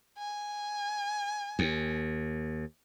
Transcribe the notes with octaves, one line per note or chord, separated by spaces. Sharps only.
G#5
D#2